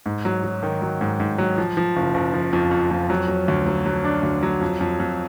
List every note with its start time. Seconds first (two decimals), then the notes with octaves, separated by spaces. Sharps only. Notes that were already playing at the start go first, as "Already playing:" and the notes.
0.06 G#2
0.25 F#3
0.44 F#3
0.63 D#3
0.82 F#3
1.01 G#2
1.20 G#2
1.38 F#3
1.58 F3
1.77 F3
1.96 F#1
2.14 F#1
2.34 F3
2.53 F2
2.71 F2
2.91 F2
3.10 F#3
3.28 F#3
3.48 D2
3.67 F#3
3.86 F#3
4.05 D4
4.23 D2
4.43 F#3
4.61 F2
4.81 F2
5.00 F2